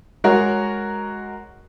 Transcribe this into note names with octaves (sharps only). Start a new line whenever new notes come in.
G#3 F#4 A#4 C#5